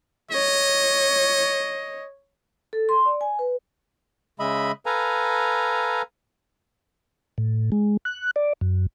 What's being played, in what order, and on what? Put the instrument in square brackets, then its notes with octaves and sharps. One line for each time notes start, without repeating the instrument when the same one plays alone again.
[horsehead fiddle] C#5 [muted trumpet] D#5
[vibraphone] A4
C6
D5
G#5
B4
[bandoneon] C#3 G#3 D#5 E5 B5
A4 B4 F5 G#5 A#5
[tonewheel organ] A2
G#3
F#6
D5
F#2